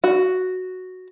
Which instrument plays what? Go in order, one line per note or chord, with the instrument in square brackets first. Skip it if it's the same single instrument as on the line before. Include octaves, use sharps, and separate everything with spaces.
[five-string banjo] F#4